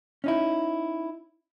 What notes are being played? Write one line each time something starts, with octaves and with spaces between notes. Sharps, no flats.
C#4 D#4 E4